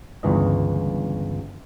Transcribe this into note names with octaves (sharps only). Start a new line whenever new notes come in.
G1 C#2 E3 D#5